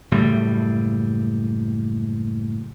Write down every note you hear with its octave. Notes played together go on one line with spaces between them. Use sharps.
F#1 A2 G3